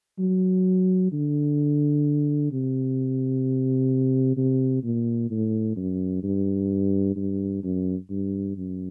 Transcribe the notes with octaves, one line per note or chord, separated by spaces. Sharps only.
F#3
D3
C3
C3
A#2
A2
F#2
G2
G2
F#2
G2
F#2